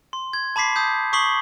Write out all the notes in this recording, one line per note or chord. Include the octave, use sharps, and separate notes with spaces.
C6
G#6
A5 B5 D6 B6 C7
A5 D#6 G6
C#6 D#6 B6 C7 F#7 G7